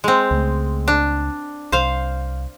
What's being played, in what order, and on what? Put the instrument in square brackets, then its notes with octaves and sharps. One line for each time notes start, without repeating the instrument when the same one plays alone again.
[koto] G#3 C4
[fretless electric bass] C#2 A3
[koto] D4
[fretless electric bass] C2 [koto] C5 F5